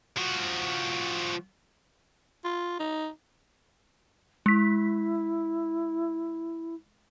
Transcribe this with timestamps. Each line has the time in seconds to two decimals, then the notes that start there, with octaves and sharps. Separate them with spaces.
0.17 F3 F#4
2.44 F4
2.79 D#4
4.46 G#3 E4 B6